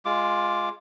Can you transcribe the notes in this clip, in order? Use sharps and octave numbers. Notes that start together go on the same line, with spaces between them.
G#3 F4 D6